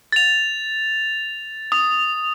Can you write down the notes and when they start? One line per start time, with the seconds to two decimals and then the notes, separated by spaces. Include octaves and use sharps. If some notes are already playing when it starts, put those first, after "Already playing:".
0.12 A6 F7
1.72 D#6